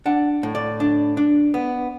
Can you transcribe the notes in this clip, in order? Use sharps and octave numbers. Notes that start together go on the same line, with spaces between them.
D4 F#5
A2
D5
D4
D4
B3